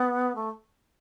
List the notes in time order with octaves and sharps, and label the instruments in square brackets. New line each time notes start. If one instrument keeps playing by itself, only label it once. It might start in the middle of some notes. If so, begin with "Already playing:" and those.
Already playing: [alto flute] B3
A3